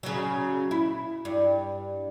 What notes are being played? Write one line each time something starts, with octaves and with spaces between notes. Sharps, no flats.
C#3 F#3
E4
G2